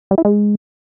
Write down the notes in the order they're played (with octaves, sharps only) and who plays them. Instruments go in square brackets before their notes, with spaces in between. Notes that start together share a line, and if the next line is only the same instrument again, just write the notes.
[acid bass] G3
E4
G#3